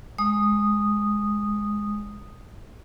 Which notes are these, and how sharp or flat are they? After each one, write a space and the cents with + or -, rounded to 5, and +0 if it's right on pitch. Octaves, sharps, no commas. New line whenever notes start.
G#3 +0 D#6 -5